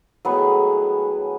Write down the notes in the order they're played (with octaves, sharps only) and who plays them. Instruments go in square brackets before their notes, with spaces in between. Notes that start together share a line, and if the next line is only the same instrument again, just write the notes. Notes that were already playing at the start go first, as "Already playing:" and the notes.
[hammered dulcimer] A2 G#3 [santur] F#3 B3 G#4